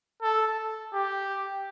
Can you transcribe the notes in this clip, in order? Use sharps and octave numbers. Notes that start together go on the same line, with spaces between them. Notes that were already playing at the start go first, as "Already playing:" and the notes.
A4
G4